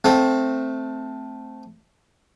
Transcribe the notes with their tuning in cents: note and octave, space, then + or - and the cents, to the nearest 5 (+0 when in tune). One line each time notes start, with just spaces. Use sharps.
A3 +0 C4 +0 F5 +35